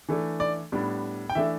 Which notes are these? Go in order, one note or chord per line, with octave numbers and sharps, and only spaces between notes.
E3 A3 D4
D5
A2 G3 B3 D4
G5
E3 A3 D4 E5